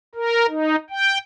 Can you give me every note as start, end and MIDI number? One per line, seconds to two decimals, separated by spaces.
0.15 0.46 70
0.48 0.76 63
0.90 1.18 79